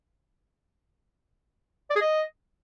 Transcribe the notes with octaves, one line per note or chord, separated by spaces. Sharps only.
D5
G#4
D#5